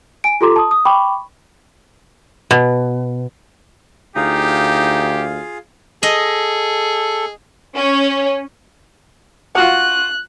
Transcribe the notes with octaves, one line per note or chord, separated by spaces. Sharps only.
G#5 D7
F4 G4 A4 A#5 C6 D6
A5 D#6
D#6
G5 B5 C#6 D6
B2
D2 D#4 F4 G4 G#4 F5
G#4 A4 D#5
C#4
F4 F#4 F#5 F#6